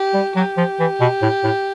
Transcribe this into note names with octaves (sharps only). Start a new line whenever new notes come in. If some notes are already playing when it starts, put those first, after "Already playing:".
Already playing: G4
G3
F#3 G4
F3
E3
B2
A2
A2